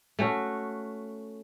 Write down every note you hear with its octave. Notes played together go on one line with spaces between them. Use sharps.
A3 C#4 F#4